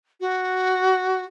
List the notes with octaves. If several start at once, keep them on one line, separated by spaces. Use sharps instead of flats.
F#4